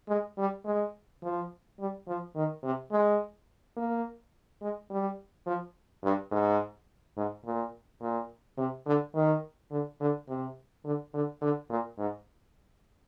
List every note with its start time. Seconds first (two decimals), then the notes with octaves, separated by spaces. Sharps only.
0.08 G#3
0.38 G3
0.65 G#3
1.23 F3
1.79 G3
2.08 F3
2.36 D#3
2.64 C3
2.92 G#3
3.77 A#3
4.62 G#3
4.90 G3
5.46 F3
6.04 G2
6.31 G#2
7.17 G#2
7.45 A#2
8.01 A#2
8.58 C3
8.86 D3
9.15 D#3
9.71 D3
10.01 D3
10.28 C3
10.85 D3
11.14 D3
11.42 D3
11.70 A#2
11.98 G#2